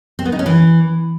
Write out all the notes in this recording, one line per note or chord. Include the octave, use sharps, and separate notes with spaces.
C4
B3
D#4
C#4
E3